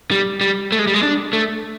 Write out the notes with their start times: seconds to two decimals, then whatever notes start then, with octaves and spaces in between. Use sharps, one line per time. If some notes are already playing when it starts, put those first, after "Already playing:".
0.11 G3
0.41 G3
0.72 A3
0.79 G#3
0.87 G3
0.94 G#3
1.03 D4
1.33 A3